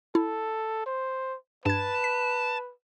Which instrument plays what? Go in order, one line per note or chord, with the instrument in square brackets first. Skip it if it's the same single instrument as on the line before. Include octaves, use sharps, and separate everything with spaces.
[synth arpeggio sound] E4 [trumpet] A4
[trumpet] C5
[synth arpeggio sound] G2 G#6 [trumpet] B4 [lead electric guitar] A5
[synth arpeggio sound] B6